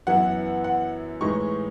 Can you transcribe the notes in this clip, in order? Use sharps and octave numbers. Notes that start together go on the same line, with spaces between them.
F#2 E3 B3 E4 F#5
F#5
A2 E3 G#3 D#4 C#6